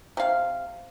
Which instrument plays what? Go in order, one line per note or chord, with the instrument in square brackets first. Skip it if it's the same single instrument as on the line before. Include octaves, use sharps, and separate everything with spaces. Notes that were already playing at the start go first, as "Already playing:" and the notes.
[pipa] C3 F5